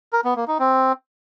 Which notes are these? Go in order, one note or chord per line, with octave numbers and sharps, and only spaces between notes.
A#4
B3
A#3
D#4
C4